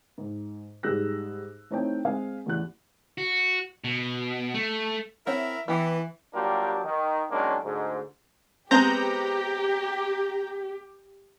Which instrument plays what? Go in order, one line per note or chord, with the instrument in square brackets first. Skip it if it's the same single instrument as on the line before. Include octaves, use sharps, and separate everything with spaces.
[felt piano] G#2
G#2 G3 G#4 E6 F#6 A#6
A3 C4 D#4 E4 C#5 G5
G#3 C4 F5 G#5
A1 E2 F#6
[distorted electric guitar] F#4
B2
A3
[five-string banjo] C4 C#5 F#5 [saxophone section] E4 A#4 E5
[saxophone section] E3 [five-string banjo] B3 E4 G4
[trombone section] F#3 G3 A#3 D4 F4 G4
D#3
D#3 F#3 G#3 A#3 C#4 D4
D2 G#2
[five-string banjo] G#3 B3 C4 [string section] G4 [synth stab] A#5 G6 A#6